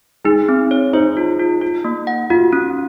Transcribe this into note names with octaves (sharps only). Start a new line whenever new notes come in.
G#3 D#4
C4
C#5
D#4 C5
F4
F4
F4
A#3
F#5
F4 F#4
C#4